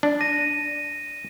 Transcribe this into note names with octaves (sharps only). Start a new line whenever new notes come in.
D4
A#6 D#7